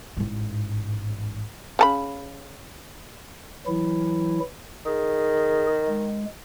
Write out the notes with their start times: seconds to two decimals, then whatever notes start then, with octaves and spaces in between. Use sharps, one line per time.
0.17 A1 G#2
1.79 C#3 A5 B5
3.66 E3 F#3 E4
4.86 D#3 G#4
5.87 G#3